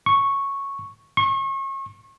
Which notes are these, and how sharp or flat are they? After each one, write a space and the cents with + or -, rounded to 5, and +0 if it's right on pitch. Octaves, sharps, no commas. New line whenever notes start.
C#6 -5
C#6 -35